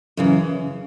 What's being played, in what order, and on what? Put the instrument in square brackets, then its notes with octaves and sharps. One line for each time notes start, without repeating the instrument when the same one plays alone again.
[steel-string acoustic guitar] F#2 C#3 E3